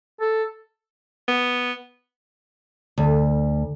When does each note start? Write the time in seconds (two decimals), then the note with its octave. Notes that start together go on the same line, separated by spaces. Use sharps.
0.21 A4
1.28 B3
2.98 D2